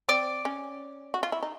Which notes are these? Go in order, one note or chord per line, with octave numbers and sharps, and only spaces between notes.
C4 D5
C#4
F#4
F4
E4
D#4